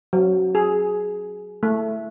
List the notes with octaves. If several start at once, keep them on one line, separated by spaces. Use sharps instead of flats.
F#3
G#4
A3